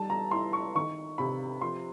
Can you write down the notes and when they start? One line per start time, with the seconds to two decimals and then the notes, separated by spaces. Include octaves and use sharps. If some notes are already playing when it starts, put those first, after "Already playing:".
Already playing: G3 D#4 A5
0.10 A#5
0.31 E4 C6
0.53 C#6
0.75 D#3 C#6
1.18 C3 B5
1.61 F3 C6